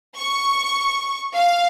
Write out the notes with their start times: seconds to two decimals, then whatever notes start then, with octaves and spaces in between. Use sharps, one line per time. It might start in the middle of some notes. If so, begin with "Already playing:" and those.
0.17 C#6
1.35 F5